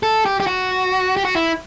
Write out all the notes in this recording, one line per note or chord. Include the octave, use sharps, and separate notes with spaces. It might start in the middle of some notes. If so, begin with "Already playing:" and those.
A4
G4
G4
F#4
G4
F#4
E4